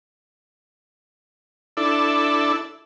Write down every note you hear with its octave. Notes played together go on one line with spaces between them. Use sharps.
D4 E4 A4